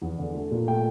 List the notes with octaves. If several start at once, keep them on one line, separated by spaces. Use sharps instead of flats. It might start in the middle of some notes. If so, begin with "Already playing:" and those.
E2
D3
A3
A#2
A3 G5